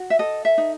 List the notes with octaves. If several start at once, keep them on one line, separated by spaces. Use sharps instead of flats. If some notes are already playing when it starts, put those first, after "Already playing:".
Already playing: F#4
E5
A4 D#5
E5
D#4